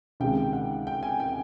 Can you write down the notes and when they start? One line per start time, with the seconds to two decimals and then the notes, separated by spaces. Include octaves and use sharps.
0.20 C#2 C3 D#3 G#3 G5
0.53 F#5
0.87 G5
1.03 G#5
1.20 G5